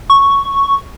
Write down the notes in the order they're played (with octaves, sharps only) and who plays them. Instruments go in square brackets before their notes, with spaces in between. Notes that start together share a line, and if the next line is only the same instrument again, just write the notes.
[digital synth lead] C#6